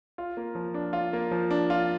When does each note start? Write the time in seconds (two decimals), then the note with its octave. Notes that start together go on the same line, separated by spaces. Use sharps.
0.18 F4
0.37 A#3
0.55 F3
0.74 D4
0.93 F4
1.13 A#3
1.31 F3
1.51 D4
1.70 F4